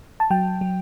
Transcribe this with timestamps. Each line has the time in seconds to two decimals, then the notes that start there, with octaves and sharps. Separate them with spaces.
0.20 A5
0.30 F#3 G5
0.61 F#3